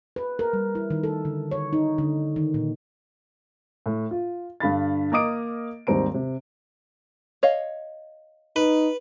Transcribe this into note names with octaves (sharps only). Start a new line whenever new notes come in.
B4
A#4
G3
E4
D#3
A4
D3
C#5
D#4
D3
D#3
A#2
A2
F4
G2 D3 F5 B5 A6
A#3 A#4 D#5 D6 D#6 D7
D#2 G#2 G3 C4 A#5 D7
C3
C#5 D#5 F5
D#4 B4